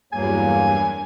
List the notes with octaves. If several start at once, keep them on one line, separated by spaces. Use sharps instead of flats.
E2 G2 F#3 A#3 G#5